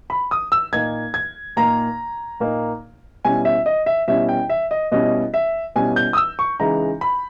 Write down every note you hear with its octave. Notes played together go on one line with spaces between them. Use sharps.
B5
D#6
E6
A#2 A#3 D#4 G#6
G#6
A#2 A#3 D#4 A#5
A#2 A#3 D#4
B2 G3 C#4 E4 G#5
E5
D#5
E5
B2 G3 C#4 E4 E5
G5
E5
D#5
B2 G3 C#4 E4 D#5
E5
B2 G3 C#4 E4 G#5
G6
D#6
E6
C#6
C#3 E3 G#3 D#4 A#5
B5